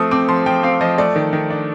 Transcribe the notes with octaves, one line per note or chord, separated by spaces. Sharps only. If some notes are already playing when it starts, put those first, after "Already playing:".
Already playing: F3 A3 C4 D#6
C4 D6
F3 C6
F3 G5
C4 F5
F3 D#5
A3 D5
D#3
D#3
D4